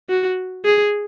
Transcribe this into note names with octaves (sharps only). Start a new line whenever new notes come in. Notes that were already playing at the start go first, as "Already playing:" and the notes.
F#4
G#4